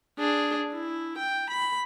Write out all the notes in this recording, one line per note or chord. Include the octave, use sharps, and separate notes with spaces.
D4 G#4
E4
G5
B5